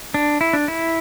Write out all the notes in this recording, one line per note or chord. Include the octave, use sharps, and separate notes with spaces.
D4
E4
D4
E4